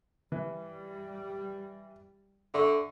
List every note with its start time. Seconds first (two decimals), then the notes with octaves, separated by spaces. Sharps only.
0.32 E3 G3
2.54 D3 E5 C6 C#6